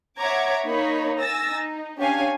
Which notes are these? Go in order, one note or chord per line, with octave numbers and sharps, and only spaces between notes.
C#5 E5 F#5 A#5 D6 G#6
A#3 D#4 A#4 C#5 B5
G#5 E6 A6 A#6
D#4
C#4 D4 G4 C#5 F5 G#5